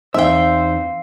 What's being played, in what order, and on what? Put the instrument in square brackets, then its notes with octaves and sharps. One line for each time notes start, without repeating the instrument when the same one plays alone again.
[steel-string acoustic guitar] E2 C4 D#4 [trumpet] C5 [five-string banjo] E5 G5 [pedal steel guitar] F5 E6